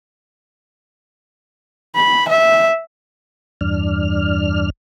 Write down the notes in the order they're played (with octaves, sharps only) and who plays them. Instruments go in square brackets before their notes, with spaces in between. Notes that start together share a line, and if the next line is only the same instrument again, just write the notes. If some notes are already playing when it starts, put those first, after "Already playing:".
[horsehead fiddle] B5
E5
[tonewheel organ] E2 G2 D4 F6